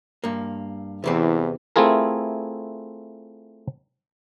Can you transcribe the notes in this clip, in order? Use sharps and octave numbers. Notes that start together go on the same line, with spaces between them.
G2 A#3
E2 C3 E3 C4
A3 C4 E4 F4 G#4 A#4